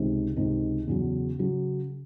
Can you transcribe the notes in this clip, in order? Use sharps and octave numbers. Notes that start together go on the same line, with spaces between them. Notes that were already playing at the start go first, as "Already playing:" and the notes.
Already playing: C#2 C3 D#3
C#2 C3 D#3
E2 C#3 F#3
C#3 F#3